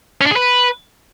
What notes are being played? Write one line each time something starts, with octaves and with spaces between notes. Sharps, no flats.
C#4
D4
G#4
B4